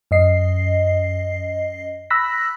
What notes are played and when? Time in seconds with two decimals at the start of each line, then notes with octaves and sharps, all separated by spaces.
0.11 F#2 D#5 C7
2.10 B5 E6 F#6 A#6 B6